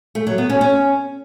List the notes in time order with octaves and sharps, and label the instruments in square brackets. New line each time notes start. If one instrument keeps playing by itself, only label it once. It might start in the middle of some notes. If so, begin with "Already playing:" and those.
[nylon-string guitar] A3
F#3
B3
C#4
C#4